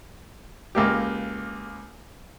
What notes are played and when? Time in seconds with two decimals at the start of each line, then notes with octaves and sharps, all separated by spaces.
0.75 C#2 A#3 G4